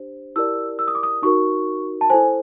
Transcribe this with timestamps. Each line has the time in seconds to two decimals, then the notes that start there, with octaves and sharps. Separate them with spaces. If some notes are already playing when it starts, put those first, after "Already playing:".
Already playing: D4 G4 C5
0.36 E4 G4 A#4 D5 E6
0.79 E6
0.88 D#6
0.95 D6
1.03 D#6
1.22 D#4 F#4 A#4 C#6
2.01 A5
2.10 E4 A4 C5 G#5